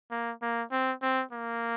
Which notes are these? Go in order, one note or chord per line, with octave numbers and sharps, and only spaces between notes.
A#3
A#3
C4
C4
A#3